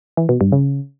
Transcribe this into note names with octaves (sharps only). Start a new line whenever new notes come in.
E3
B2
G2
C#3